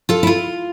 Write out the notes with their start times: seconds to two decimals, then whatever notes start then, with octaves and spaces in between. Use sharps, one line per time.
0.09 F4 A4
0.23 E4
0.27 F4